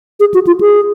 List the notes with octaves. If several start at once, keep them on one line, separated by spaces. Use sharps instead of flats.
G#4
F#4
F4
G#4